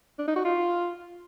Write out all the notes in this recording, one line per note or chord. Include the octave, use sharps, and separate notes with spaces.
D4
D#4
F#4
F4